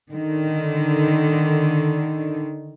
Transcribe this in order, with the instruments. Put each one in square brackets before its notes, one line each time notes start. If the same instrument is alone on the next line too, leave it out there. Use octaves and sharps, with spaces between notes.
[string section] D3 D#3